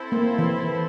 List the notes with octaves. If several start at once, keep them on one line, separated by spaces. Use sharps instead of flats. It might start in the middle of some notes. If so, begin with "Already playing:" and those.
Already playing: C4 E4 A4 C5
A#3
E3
E3